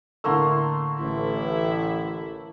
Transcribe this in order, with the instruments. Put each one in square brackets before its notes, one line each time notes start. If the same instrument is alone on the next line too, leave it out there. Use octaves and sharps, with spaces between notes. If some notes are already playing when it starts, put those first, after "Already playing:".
[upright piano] A2 D3 E6 [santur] A3 A#3 C6
[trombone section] A1 [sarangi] E4